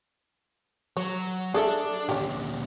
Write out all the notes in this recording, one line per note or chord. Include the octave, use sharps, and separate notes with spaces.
F#3 C#5
D4 G#4 A4 E5
D2 A#2 C#4 G4